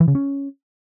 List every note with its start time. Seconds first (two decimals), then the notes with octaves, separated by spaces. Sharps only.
0.01 E3
0.08 C#3
0.15 C#4